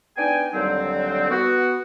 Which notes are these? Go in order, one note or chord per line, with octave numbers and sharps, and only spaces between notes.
B3 D4 D#4 G5 G#5
D#2 D3 F#3 G3 C4
B3 F#4